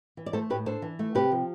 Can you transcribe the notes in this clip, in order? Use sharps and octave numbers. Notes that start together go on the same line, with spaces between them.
E3
D5
A3 A4 C5
A2 G4 B4
D4 A4 C5
E3
A3
C3 G4 B4
F3